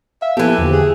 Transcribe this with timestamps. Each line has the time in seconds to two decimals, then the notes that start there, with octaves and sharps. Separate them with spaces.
0.22 E5 F5
0.37 E3 F3 A#3 B3 G4 A4
0.58 E2 D3 F3
0.72 G#4